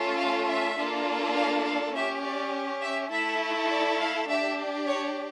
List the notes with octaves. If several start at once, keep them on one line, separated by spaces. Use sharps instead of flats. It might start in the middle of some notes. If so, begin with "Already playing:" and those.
Already playing: A3 C#4 F4 A4
F5
E5
A#3 D4 F4 A4
F5
F5
C#4 G4 E5
D5
E5
A3 E4 A4 E5
D5
F5
D4 G4 E5
C#5